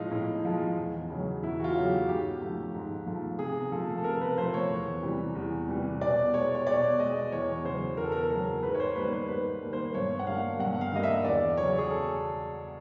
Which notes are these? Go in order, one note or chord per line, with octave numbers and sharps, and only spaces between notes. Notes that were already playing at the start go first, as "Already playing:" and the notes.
Already playing: A2 F3 G#3 D#4 F4
A2
F3 G#3
E2
C#3 F#3
E2 E4
F#4
F4
C#3 F#3
G4
G#2 G4
F3 A3
G#2
F3 A3
C3 G#4
F3 A3 A4
A4
C3 A#4
B4
F3 A3 C5
C#5
E2
C3 E3 G3
E2
C3 E3 G3
B2 D5
G#3 C#5
C#5
B2 D5
G#3 D#5
E2 C#5
C#3 F#3 C5
E2 A#4
A4
A#4
C#3 F#3 A#4
G#2 B4
C#5
C5
D#3 G3 A#3 B4
C5
G#2 B4
D#3 G3 A#3
C5
G2 C#5
F#5
D3 G3 A#3 F5
G2 F#5
F5
D3 G3 A#3 D#5
E5
E2 D5
C#3 F#3 C#5
G#4
A4